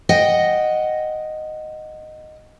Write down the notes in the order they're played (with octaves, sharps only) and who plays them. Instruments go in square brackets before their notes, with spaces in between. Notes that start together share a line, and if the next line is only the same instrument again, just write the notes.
[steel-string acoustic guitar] D#5 F#5 G5